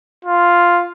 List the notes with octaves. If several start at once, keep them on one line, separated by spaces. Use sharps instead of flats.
F4